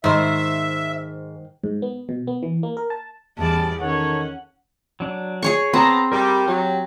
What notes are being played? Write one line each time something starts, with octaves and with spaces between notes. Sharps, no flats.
G#2 D#3 C5 E5
G#2
B3
B2
B3
E3
A#3
A#4
A5
A1 E2 G3 D5 A5
D#3 C#4 A4 C#5 F#5
F#3 D4
G#4 C#5 C#6
B3 C4 B4 A5 A#5
G3 G4 A#4
F#3 G4